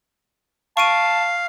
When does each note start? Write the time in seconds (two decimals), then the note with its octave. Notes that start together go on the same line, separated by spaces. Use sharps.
0.77 F5 A5 C#6 D7 D#7